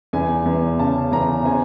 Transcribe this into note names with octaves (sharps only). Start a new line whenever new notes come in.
E2 G#5
E2
C#3 A5
E2 A#5
C4 G#5